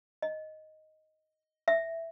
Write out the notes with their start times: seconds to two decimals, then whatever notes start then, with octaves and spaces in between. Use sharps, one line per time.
0.22 D#5
1.68 E5